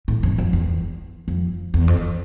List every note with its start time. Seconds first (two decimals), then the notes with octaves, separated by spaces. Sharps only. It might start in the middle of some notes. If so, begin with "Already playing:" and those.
0.08 A2
0.23 F#2
0.38 F2
0.53 E2
1.28 F2
1.74 E2
1.88 F2